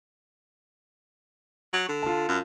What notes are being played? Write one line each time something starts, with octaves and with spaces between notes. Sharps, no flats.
F#3
D3
F4 A5
F#2